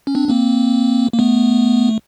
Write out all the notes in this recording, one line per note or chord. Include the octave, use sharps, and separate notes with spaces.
C#4
C4 D4
A#3 C4
A#3
A3 B3